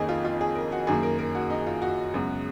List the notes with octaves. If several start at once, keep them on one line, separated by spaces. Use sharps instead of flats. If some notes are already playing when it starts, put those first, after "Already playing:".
Already playing: F2 D#3 A#3 C#4 G#4 D#5
F4
F4
G#4
A#4
F#4
F#2 D#3 A#3 G#4
A#4
A#4
F#4
D#4
F4
F#4
F#2 C#3 G#3 B3